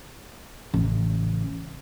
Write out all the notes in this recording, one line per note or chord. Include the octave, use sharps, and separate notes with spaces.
A1 C#3